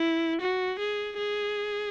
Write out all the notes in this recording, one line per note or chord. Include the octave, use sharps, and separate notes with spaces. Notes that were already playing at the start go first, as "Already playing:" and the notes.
Already playing: E4
F#4
G#4
G#4